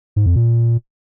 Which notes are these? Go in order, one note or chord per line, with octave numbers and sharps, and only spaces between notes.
G#2
F2
A#2